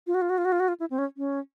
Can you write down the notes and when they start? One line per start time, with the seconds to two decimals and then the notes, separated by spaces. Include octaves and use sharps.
0.07 F4
0.14 F#4
0.22 F4
0.30 F#4
0.38 F4
0.45 F#4
0.52 F4
0.60 F#4
0.68 F4
0.80 E4
0.90 C4
0.98 C#4
1.17 C#4